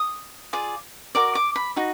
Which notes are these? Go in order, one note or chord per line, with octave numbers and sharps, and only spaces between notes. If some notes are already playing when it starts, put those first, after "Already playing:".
Already playing: D#6
F4 G#4 D5
F#4 A#4 D5 D6
D6
B5
D#4 F#4